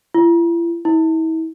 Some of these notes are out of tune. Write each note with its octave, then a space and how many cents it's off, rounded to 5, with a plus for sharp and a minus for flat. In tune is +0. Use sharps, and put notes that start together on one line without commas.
E4 +45
E4 -40